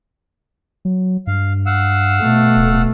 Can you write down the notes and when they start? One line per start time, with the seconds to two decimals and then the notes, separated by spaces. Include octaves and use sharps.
0.85 F#3
1.27 G2 F5
1.66 F5 F#5 E6
2.22 B2 A3
2.56 D1